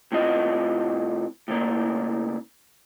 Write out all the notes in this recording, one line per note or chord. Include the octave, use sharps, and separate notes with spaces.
A2 C3 C4 F4 D#5
A2 C#3 A#3